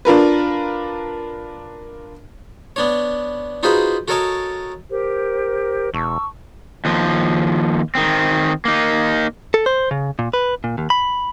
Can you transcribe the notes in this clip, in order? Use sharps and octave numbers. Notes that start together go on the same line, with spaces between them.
D4 F4 A#4 B4
B3 D4 C#5
D#4 F4 F#4 G#4 B4 C5
F#4 A4 A#4 C#5 D#5 A5
G4 A#4 C5
E1 A5 C#6 E6
D#2 F3
D#3 C4
A#3 D#4
A4
C5
C#3
A#2
B4
A#2
D#2
B5